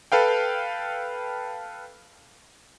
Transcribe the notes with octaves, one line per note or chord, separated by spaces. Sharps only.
A4 B4 F5 G5